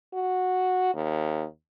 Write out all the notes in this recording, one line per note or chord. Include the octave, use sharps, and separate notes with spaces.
F#4
D#2